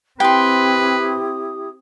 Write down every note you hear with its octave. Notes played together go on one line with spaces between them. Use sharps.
C4 E4 G4 B4 G5 C6 D#6